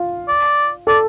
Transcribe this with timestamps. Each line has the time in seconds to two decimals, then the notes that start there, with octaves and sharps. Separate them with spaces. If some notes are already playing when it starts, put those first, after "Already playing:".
Already playing: F4
0.28 D5
0.87 A4 D5